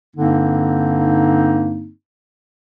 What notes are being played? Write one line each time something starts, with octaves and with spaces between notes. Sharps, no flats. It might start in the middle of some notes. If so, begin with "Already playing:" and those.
G2 D3 A#3 C4 D#4